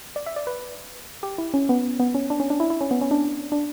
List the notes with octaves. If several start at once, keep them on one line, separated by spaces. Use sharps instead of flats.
D5
E5
D5
B4
G4
E4
C#4
B3
B3
C#4
D4
C#4
D4
E4
E4
C#4
B3
C#4
D4
D4